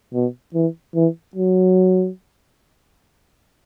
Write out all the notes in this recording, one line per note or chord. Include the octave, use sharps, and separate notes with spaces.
B2
E3
E3
F#3